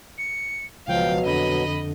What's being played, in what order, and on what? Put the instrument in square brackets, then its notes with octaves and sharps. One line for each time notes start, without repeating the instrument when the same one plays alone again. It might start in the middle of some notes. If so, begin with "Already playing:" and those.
[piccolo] C#7
[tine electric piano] C#2 F3 [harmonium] B2 F#3 [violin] F5 [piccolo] G5
[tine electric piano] F2 D3 [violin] D#5 [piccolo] B5